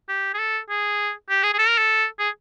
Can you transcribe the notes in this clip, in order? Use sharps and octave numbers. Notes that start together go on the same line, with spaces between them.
G4
G#4
A4
G#4
G4
G#4
G#4
A4
A#4
A4
G#4